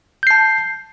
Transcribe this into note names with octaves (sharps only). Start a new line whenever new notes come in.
A5 G6 C7